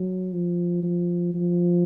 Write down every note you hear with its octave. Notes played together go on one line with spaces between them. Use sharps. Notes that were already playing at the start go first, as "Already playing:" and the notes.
Already playing: F#3
F3
F3
F3